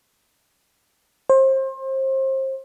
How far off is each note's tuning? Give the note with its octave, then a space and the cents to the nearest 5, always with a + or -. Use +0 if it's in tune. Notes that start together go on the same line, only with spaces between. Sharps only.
C5 +30